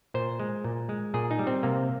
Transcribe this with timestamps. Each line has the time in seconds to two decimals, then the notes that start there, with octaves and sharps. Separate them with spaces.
0.14 A#2 C5
0.39 G#3
0.64 A#2
0.89 G#3
1.14 A#2 G#4
1.31 D#4
1.39 G3
1.47 C4
1.63 C3 A#3